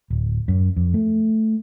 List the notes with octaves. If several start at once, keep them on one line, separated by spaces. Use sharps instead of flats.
D1
F#2
F2
A3